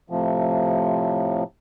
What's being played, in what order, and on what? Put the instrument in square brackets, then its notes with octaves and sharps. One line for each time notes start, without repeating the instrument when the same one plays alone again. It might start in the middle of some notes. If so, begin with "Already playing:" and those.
[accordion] A2 C3 F3